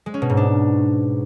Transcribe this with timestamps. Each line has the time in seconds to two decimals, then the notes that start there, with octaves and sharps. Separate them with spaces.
0.06 G#3
0.14 C#4
0.22 B2
0.30 G#2
0.37 D4